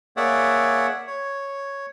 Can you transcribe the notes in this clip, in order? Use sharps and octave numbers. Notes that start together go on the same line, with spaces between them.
A#3 G#4 C#5 D5 E5 F#5
C#5